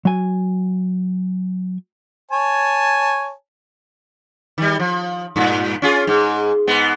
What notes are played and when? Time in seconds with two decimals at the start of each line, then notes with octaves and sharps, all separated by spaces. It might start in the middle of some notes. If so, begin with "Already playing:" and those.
0.05 F#3 G#5
2.31 C#5 G#5 A5
4.58 D#3 G3
4.80 F3
5.36 G2 A#2
5.82 C#4 F4 G#4
6.07 G#2
6.67 G#2 G#3 B3